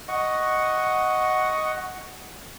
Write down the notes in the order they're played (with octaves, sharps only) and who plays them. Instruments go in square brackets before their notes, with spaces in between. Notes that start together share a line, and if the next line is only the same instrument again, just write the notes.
[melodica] D#5 F#5 C#6